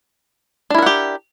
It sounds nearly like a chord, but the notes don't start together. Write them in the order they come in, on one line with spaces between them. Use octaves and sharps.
D4 E4 A#4 F#5 G4